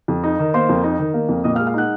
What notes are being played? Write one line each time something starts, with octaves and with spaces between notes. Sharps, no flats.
F2
D#4
D#3
A#3 C5 C6
F2
D#4
D#3
A#3
F2
A#2 D#5 D#6
F5 F6
G#3
F5 F6
D#4 F#5 F#6